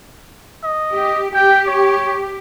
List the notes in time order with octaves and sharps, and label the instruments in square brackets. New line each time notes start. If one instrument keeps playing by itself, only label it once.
[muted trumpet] D#5
[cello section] G4
[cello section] G4 [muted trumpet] G5
[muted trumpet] C#5